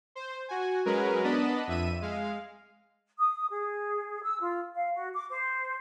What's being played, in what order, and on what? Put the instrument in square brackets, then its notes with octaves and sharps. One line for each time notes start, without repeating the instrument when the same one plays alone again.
[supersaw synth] C5
F#4 G#5
F#3 G#3 C#4 A#4 B4
B3 D4 D#5 A5 B5
F2 E5 D#7
G#3 F5
[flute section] D#6
G#4
E6
F4
F5
F#4
D6
C5